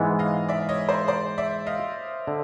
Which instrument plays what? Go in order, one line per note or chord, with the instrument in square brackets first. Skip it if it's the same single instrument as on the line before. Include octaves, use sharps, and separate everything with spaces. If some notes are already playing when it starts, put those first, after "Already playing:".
Already playing: [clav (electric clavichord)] G#2 E3 G#3 B3
[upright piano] D#5 F5
D5 E5
C#5 D#5
C5 D5
C5 D5
D5 E5
D#5 F5
[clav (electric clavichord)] D3